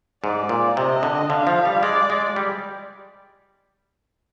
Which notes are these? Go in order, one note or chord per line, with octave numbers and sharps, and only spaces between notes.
G#2 D5
A#2
C3 D#5
D3
D3 F5
F3
G3
G#3 D5
G#3
G3